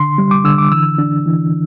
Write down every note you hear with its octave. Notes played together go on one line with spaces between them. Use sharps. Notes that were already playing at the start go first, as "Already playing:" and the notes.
Already playing: D3 C6
G3
D6
D3 E6
D6
E3 E6
D4
E3